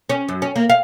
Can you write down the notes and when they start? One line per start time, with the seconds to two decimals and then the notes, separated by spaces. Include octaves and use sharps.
0.10 C#4
0.29 F#2
0.42 C#4
0.56 A#3
0.70 F5